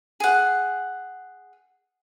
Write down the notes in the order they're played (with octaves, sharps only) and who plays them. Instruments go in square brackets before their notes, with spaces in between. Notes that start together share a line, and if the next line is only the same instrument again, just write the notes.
[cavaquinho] G#4 F#5